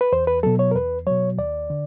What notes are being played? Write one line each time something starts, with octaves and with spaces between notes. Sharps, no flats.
B4
E2 C5
B4
B2 F#3 A4
C#5
A#4
E2 B4
B2 F#3 C#5
D#2 D5
D3